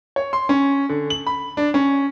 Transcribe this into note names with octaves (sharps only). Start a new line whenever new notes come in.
C#5
C6
C#4
D3
F#7
B5
D4
C#4